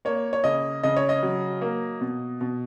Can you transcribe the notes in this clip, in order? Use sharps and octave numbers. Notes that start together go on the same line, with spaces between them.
A#3 C#5
C#5
C#3 D#5
C#3 D#5
C#5
D#5
F#3
A#3
B2
B2